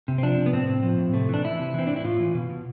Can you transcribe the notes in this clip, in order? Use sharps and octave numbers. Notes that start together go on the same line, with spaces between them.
C3
C4
F3 D4
C3
B3
A2 C4
A2
F3
A2
C3 A3
E3 D4
E3 E4
C3
E3 C4
A2 D4
E4
A2 F4
E3
B2
B2